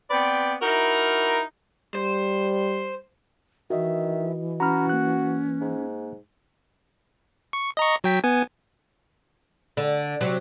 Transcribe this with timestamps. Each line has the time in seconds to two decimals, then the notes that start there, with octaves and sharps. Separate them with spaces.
0.11 B3 C4 B4 D5 G5
0.62 D#4 E4 F#4 A#4
1.95 G3 C5
3.70 D#3 E3 F#4 D#5 E5
4.60 C#4 F#4 A#5 B5 F6
4.89 A#3 F#6
5.61 G#2
7.53 C#6
7.77 D#5 A#5 C#6
8.04 F#3 G5 B6
8.24 B3 G#5
9.77 D3
10.21 C3 F#3